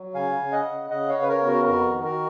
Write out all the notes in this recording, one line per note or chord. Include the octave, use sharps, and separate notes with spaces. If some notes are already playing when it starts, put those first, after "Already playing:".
Already playing: F#3
C#3 F5 G#5
C#3
D#5 F#5
C#3
C#3 D#5 F#5
C#5 F5
C#3
B4
A#4 C#5
B3
F#4 A#4
F2 F#4 A#4
D#3
F#4 A#4